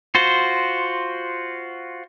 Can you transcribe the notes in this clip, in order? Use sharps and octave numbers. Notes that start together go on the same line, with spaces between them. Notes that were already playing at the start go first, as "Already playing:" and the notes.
F4 F#4 C5